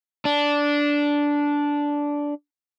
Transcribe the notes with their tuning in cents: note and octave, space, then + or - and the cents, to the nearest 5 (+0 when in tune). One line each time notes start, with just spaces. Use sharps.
D4 -10